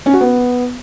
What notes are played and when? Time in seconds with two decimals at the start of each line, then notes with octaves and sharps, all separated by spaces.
0.06 C#4
0.13 F#4
0.21 B3